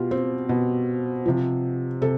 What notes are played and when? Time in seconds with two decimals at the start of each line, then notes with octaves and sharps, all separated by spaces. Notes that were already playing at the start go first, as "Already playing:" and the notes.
Already playing: B2 F4 G4
0.11 C4
0.49 B2
1.26 C3 F3
2.02 C3 A4